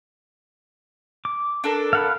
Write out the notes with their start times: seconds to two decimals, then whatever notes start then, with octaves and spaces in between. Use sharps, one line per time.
1.25 D6
1.64 D4 A4 A#4
1.93 F5 F#5 B5